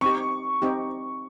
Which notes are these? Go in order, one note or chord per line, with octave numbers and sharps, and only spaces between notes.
C4 D#4 G4 C#6
C4 D#4 G4